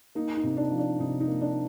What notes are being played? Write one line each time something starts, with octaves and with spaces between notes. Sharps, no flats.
A#3 D#4
D#4
C3
D4
F3
D4
C3 D#4
D#4
A#3
D4